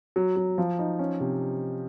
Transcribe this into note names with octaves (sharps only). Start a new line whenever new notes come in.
F#3
F#3
F3
D#4
C#4
C3